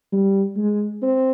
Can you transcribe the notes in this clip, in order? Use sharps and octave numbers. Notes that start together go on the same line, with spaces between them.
G3
G#3
C4